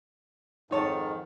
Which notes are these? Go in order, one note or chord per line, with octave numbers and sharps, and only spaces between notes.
F2 G#2 D#3 D#4 C#5 A5